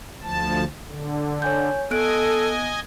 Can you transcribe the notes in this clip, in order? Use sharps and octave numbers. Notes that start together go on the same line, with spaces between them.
D2 F3 A5
D3
C#5 G#5 G6
B3 A4 D#5 G#5 F#6 D7